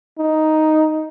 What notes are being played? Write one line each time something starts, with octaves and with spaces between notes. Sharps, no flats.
D#4